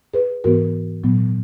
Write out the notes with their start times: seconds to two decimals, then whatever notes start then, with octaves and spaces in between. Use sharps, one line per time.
0.14 G#4 B4
0.44 G#2 E3 B3 F#4 A#4
1.04 A#2 F#3 B3